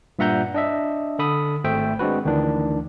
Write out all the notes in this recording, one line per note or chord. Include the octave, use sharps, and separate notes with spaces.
G2 A#2 E5 F#5 A#5 G6
D4 D#5 E5
D3 A4 B5 D#6
G#1 A3 C5 E5 G5
G#3 C4 D4 F#4 B4
D2 D#3 E3 D4